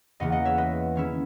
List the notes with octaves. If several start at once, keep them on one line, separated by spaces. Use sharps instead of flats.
E2 C#3 E3 A#3 D#5 F#5
D#5 F#5
C#5 E5
B4 D#5
D#3 G#3 C#4 E4